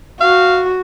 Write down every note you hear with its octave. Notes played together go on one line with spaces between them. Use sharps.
F#4 F5